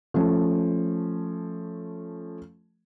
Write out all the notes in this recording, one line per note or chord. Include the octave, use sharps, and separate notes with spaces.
F3 A3 C#4